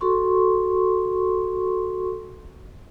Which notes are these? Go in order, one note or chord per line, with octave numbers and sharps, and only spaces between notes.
F#4 A4 C6 C#6